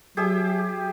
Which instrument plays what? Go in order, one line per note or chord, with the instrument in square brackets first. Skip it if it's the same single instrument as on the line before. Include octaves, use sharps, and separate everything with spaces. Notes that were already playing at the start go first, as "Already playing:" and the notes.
[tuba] F#3 [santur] G4 G#4 E5